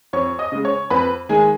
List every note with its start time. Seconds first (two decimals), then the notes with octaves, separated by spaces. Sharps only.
0.13 F2 C#5 C#6
0.39 D#5 D#6
0.52 C#3 G#3
0.65 C#5 C#6
0.90 F2 B4 B5
1.29 D#3 G#3 G#4 G#5